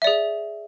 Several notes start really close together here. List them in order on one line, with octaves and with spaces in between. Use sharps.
E5 D5 G#4